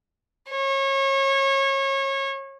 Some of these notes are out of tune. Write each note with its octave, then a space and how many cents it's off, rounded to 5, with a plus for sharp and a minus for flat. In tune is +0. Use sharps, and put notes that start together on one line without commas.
C#5 -30